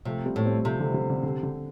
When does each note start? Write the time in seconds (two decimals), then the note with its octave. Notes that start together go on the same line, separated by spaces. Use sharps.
0.05 C3 F3 A3
0.25 G3 C4
0.36 A2
0.45 G3 C4
0.65 C3 F3 A3
0.79 D3 G3
0.94 D3 G3
1.10 D3
1.23 D3
1.43 D3